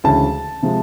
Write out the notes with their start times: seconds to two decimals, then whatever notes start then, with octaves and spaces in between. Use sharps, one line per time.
0.04 D2 C#3 E3 G#3 C#4 A5
0.62 C3 F3 G#3